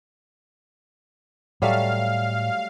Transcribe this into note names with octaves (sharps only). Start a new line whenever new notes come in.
A2 F#3 G3 A3 F5